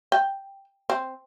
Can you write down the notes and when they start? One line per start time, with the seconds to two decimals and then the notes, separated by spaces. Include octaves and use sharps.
0.12 G5
0.90 C4